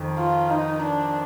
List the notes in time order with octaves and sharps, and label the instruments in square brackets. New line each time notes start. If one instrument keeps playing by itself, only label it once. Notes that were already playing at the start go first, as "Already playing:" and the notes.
Already playing: [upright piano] F2 D#3
[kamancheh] F4
D#4
D4